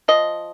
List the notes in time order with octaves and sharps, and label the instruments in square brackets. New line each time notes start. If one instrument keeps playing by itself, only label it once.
[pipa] F3 D#5